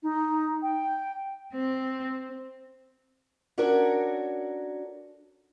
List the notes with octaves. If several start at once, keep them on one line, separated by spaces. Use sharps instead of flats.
D#4
G5
C4
C#4 D4 F#4 A4 A#4 C#5